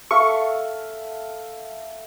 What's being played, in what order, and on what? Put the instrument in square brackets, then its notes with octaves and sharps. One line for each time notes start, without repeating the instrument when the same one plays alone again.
[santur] A4 E5 F5 [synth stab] C#6